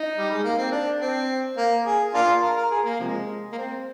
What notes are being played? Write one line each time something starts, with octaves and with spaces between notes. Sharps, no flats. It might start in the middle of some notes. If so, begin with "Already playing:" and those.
Already playing: D#4
G3
G#3
A#3
C4
D4
C4
A#3
G#4
A#3 D4 F4
A#4
A#4
G#4
A#3
C3 F3 G#3
A#3
C4